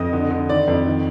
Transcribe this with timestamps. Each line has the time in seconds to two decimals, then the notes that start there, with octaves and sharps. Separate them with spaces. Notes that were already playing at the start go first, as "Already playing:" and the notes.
Already playing: F2 D#5
0.13 D3
0.30 D3
0.49 D#3 D5
0.68 F2
0.86 D#3